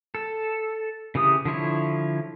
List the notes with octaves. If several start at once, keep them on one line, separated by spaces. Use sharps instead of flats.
A4
C#3 E3 G4 D#6
D3 F3 E4 C#5